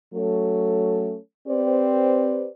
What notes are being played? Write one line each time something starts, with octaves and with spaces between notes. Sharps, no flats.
F#3 A3 C#4 A4
C4 G4 B4 C5 D5